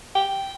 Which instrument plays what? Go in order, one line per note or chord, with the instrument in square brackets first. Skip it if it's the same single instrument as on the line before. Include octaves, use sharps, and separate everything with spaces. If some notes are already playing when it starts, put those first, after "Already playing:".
[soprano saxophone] G5